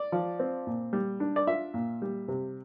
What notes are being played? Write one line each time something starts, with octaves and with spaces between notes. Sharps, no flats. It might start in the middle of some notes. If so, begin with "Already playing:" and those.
Already playing: D5
F3
C4
A#2
G3
D4
D5
F4 E5
A#2
G3
C3